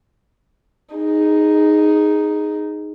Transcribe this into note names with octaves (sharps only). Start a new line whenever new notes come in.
D#4 G#4